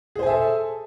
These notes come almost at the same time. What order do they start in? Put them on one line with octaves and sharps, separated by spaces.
G#4 C5 G#5 E5 A4